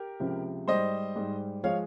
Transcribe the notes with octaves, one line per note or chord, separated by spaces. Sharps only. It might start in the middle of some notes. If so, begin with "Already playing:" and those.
Already playing: G4 A#4
C#2 C3 F3
G#2 G3 C5 D#5
G#2 G3
F3 G#3 C#5 F5